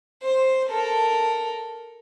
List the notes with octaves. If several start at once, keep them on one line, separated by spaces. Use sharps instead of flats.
C5
A4 A#4